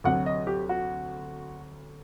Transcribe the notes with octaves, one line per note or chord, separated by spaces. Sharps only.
D2 C3 F#3 C4 F#5
D#5
G4
F#4